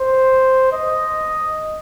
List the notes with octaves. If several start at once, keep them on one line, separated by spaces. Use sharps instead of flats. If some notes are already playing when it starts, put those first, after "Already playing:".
Already playing: C5
D#5